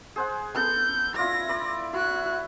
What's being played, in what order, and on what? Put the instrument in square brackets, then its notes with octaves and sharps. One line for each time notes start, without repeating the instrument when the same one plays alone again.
[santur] G#4 C5 F#5
[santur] B3 A4 [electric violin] G6
[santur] E4 F4 D5 [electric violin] A#6
[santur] D5 B5
[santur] E4 [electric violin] F#4 F#6